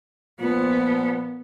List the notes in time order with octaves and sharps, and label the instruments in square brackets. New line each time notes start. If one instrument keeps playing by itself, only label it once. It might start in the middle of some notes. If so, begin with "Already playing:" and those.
[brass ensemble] A#2 F3 [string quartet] B3